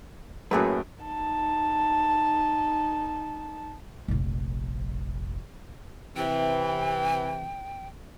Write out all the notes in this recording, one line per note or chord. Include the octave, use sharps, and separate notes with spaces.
F#2 A2 F#3 A#3 G#4 B4
D#4 A5
F1 A#1
C3 E3 G5